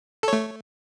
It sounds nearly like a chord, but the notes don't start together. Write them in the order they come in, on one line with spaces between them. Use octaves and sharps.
A4 C#5 A3